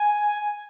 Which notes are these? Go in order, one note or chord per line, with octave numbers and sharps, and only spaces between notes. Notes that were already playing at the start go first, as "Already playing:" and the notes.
Already playing: G#5